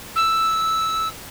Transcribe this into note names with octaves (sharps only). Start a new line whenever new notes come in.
E6